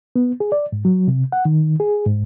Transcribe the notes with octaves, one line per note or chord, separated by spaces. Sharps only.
B3
G#4
D5
G#2
F#3
C3
F#5
D#3
G#4
G#2